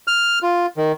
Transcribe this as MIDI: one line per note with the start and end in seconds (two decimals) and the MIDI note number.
0.08 0.39 89
0.43 0.66 65
0.77 0.92 51